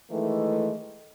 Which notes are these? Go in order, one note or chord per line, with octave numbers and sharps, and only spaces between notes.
D#3 E3 G#3 A3